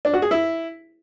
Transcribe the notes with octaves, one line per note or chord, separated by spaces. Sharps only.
D4
F#4
G#4
E4